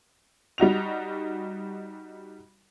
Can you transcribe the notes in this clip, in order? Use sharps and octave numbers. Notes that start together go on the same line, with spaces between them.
G3 D#4 F#4 F7